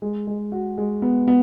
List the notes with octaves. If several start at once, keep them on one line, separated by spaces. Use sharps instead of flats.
G#3
G#3
F#4
G#3
B3
B3